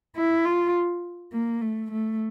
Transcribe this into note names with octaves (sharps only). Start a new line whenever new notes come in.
E4
F4
A#3
A3
A3